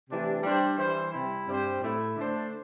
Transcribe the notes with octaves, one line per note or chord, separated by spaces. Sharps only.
C3 E3 A3 D4 G4
G3 D4 G4 C5
E3 G3 E4 C5
C3 G3 E4
G2 G3 C4 G4 C5
A2 A3 E4
D3 A3 D4 C5